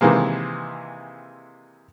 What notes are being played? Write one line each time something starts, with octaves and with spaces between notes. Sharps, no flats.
C3 D#3 E3 G#3 A#3